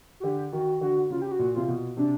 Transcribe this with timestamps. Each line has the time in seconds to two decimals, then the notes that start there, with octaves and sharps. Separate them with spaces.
0.20 F#4
0.23 D3 G4
0.52 D#3 F#4
0.81 D3 F#4
1.10 C#3 F4
1.22 G4
1.32 F#4
1.39 A#2
1.54 C3 F4
1.68 B2
1.97 C3 D4